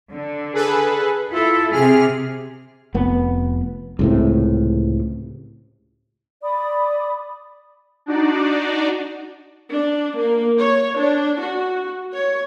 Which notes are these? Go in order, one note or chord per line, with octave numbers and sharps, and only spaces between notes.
D3
G#4 A4 B4
E4 F4 A4
C3 G#4 F6
F1 B3
C#2 A2 C3
D5 B5 D6 D#6
D4 D#4 F#4 D5
D4
A#3
C#5
D4
F#4
C#5